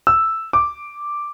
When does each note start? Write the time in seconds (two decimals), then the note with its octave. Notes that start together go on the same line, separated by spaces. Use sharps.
0.07 E6
0.53 D6